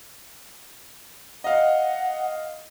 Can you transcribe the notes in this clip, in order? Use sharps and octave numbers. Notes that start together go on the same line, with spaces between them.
D#5 F5 F#5